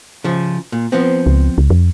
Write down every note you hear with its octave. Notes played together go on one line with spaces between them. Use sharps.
C#3 F3
A#2
F3 B3 C4
C#2
C#2
F2